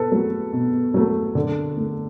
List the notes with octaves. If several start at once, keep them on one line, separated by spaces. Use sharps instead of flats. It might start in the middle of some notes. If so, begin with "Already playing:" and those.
Already playing: B2 A4 B4
F#3 A3
B2
F#3 A3
D3
A3